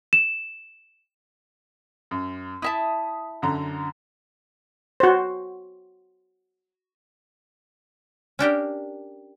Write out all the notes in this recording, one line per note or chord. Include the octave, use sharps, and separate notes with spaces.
E7
F#2
E4 E5 A5 D#6
F#2 D3 A#5
F#4 C5
C#4 D4 G4 A#4